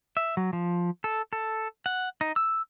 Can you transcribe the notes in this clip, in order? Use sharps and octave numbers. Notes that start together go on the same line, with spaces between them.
E5
F#3
F3
A4
A4
F#5
D#4
E6